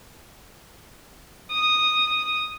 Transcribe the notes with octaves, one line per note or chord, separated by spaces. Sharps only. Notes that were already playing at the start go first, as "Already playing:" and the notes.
D#6